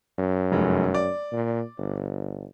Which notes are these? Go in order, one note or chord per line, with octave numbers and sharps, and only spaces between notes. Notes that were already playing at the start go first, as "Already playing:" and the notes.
F#2
F1 G#3
D5
A#2
G1